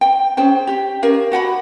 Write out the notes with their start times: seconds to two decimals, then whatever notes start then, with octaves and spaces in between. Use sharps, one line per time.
0.01 G5
0.37 C#4 G#4 C5 G5
0.67 G4
1.02 C#4 G4 A#4 F5
1.32 F#4 F#5 G5 B5